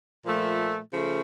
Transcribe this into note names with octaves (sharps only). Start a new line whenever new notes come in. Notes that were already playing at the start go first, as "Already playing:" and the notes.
A#2 F3 A3
C#3 F3 A3